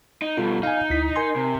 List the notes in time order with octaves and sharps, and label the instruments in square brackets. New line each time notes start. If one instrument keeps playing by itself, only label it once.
[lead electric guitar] D#4
[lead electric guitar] B2 G3 [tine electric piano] F4 A4
[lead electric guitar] D#4 [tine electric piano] F5 G#5
[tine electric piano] D2 E4 B6
A#4 G#5 C6
[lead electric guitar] C3